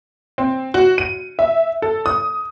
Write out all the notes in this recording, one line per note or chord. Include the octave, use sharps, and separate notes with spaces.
C4
F#4
D#7
E5
A4
D#6